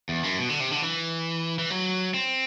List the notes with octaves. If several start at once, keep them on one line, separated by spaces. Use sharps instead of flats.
E2
F#2
B2
D3
C3
D3
E3
E3
F#3
C4